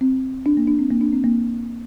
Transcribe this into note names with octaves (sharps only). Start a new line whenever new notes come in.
C4
D4
A#3
D4
C4
A#3
D4
C4
A#3